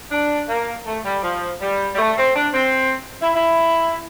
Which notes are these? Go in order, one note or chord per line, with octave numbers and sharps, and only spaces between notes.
D4
A#3
A3
G3
F3
G3
G3
A3
C4
D4
C4
E4
E4